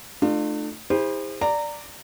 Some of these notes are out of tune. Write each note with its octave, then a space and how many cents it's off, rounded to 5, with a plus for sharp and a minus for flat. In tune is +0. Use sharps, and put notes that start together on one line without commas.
A3 +0 D4 +40 F4 +0
E4 -25 G#4 -45 C5 +0
D5 +0 A#5 -20